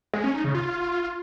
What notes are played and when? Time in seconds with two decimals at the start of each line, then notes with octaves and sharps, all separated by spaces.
0.14 G#3
0.24 C#4
0.34 D#4
0.44 C#3
0.55 F4